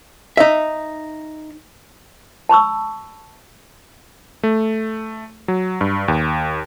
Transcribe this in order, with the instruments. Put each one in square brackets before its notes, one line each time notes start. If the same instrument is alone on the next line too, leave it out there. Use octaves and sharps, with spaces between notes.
[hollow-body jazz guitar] D#4 E5
[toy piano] A5 B5 C#6 E6
[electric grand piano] A3
F#3
G2
D#2